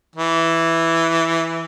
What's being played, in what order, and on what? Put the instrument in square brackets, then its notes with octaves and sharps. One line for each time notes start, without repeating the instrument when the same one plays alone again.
[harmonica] E3